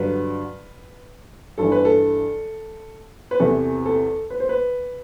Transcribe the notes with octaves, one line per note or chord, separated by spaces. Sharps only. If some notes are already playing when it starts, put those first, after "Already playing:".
Already playing: G2 D3 F#3 B4
G2 E3 A4
B4
A4
B4
E2 C3 E3 A4
A4
B4
C5
B4